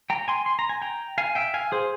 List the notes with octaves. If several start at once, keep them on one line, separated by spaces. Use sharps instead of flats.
G5 A#5
G#5 C6
C6
A#5
G#5
G5 A#5
F5 G#5
E5 G5
F5 G#5
G#4 C5